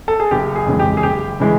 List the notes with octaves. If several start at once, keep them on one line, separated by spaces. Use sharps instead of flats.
A4
G#4
F#1 G4
G#4
F2 C#3 E3 G#3
G4
G#4
F#1 G4
C#3 E3 G#3